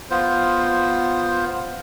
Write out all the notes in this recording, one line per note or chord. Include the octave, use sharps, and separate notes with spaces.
B3 F4 C5